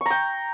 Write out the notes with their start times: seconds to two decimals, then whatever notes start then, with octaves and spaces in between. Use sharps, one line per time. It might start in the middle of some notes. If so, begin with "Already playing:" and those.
0.01 C#6
0.06 A#5
0.10 G5